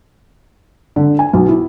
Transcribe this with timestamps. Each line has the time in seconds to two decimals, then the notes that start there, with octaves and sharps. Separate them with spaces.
0.96 D3
1.19 G#5
1.33 B1
1.48 E4